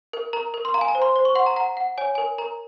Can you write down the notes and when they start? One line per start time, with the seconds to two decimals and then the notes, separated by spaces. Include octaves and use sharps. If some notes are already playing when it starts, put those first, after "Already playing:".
0.13 A#4
0.33 A#4 A#5
0.54 A#4
0.65 C6
0.74 F5 A#5
0.81 G#5
0.88 A#5
0.95 C5
1.02 C6
1.16 C5
1.25 C#6
1.35 F#5 C6
1.46 A#5
1.56 F#5 A#5
1.77 F#5
1.98 C#5 G#5
2.15 A#4 G#5
2.38 A#4 A#5